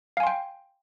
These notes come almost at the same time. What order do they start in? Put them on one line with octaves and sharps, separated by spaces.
F5 G#5 C6 G5